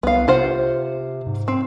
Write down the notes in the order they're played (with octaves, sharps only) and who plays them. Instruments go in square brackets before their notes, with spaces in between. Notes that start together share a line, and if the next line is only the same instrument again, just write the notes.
[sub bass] C2 [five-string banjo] B3 F5
[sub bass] C3 [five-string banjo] F4 C5 F#5
[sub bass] G#2
[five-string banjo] C4